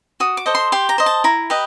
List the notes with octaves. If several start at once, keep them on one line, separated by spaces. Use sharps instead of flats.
F#4 D#6
D6
A4 C5 D#5
C6
G4 C6
A#5
C5 D#5
A5
E4 A#5
G4 B4 D#5